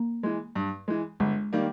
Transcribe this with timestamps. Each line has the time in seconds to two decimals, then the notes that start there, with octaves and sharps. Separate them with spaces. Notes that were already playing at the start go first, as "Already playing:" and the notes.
Already playing: A#3
0.23 E3 G#3
0.55 G2
0.88 E3 G#3
1.20 G1 G#3
1.53 D#3 G3 A#3